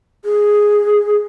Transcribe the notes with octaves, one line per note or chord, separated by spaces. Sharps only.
G#4